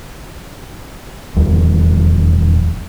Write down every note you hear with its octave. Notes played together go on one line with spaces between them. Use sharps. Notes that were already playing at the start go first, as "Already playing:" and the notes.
D#1 E2 F3 G3